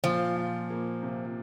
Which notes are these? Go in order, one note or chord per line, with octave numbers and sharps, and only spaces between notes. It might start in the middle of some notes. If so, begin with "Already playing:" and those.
A#2 F3
A#2
A#3
C3